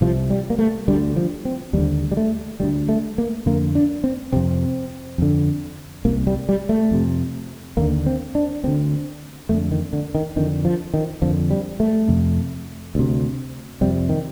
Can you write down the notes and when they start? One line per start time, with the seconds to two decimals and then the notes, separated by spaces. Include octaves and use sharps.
0.01 C2 C3 F3
0.30 G3
0.50 A#3
0.59 A3
0.88 D2 D3 G3
1.16 F3
1.45 C4
1.73 D#2 D3 G3
2.12 G3
2.17 A3
2.60 D2 D3 G3
2.89 A3
3.18 A#3
3.46 F2 D3 A#3
3.75 D4
4.04 C4
4.32 F2 C3 C4
5.18 F2 D3
6.05 C2 C3 A#3
6.27 G3
6.49 G3
6.69 A3
6.91 F2 C3
7.77 D#2 D3 A#3
8.06 C4
8.35 D4
8.64 D2 C4
8.68 D3
9.49 F2 D3 A3
9.71 D#3
9.93 D3
10.15 D#3
10.36 F2 D3 D#3
10.65 F3
10.94 D#3
11.22 F2 D3 F3
11.50 G3
11.80 A3
12.08 F2 C3
12.95 D2 C3
13.81 F2 C3 G3
14.09 D#3